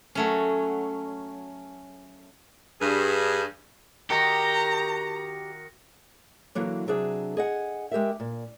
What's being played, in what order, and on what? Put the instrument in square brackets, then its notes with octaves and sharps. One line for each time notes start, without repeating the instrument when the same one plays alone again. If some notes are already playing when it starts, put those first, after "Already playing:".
[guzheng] F#3 A3 C#4
[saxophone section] G2 G#4
[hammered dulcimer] D#3 F#4 A#4 [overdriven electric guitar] G4 [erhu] A#5 [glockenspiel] A#6 C#7
[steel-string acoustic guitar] D3 E3 F#3 A#3
C3 F#3 D4 G#4 E5
G#4 D#5 F#5
G#3 G4 A#4 E5
A#2